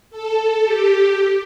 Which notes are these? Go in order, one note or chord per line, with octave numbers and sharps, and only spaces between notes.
A4
G4